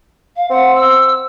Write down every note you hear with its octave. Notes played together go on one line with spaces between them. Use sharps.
F5
C4 F#5
E6